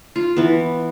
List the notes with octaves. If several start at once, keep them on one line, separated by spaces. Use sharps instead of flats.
F4
E3 B3